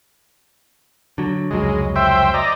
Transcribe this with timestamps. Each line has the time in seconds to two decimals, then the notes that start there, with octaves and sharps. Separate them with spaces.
1.18 D3 F#3
1.51 F1 C#2 F#3 G#3
1.96 C5 E5 G5
2.34 D5 D#5 A#5